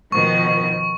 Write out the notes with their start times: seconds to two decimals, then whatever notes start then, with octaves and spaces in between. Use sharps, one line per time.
0.12 B2 D#3 F3 C#6